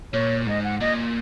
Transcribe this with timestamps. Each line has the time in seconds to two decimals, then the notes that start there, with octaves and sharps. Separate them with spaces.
0.13 A#2 C#5
0.47 G#2 D#5
0.64 F#5
0.80 A#2 D#5